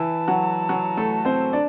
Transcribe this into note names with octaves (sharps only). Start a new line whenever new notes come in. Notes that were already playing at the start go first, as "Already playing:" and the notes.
Already playing: E3 E4 A5
F#3 F#4
F#3 F#4
A3 A4
C4 C5
D4 D5